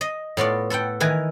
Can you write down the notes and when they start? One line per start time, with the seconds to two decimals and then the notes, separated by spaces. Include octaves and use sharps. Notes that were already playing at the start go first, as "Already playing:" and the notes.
0.01 D#5
0.37 A2 B3 F4 D5
0.70 A4 B4 F#5 G5
1.00 D#3 E3 B4 G#5 A#5